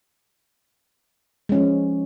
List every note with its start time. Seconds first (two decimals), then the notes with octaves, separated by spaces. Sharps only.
1.49 G#3
1.52 C#4
1.55 F3